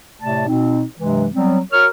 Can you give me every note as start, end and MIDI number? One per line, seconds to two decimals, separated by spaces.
0.22 0.44 45
0.22 0.44 48
0.22 0.44 57
0.22 0.44 74
0.22 0.44 81
0.47 0.83 47
0.47 0.83 60
0.47 0.83 63
0.99 1.26 43
0.99 1.26 48
0.99 1.26 52
0.99 1.26 54
0.99 1.26 56
1.32 1.59 54
1.32 1.59 55
1.32 1.59 59
1.32 1.59 60
1.72 1.87 66
1.72 1.87 70
1.72 1.87 73
1.72 1.87 85
1.72 1.87 89